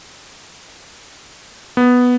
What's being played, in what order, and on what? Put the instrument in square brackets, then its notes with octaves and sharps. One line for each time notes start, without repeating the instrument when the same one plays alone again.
[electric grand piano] B3